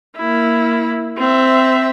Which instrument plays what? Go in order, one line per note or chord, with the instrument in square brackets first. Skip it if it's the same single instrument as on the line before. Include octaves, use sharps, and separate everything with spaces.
[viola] A#3 E4
C4 E5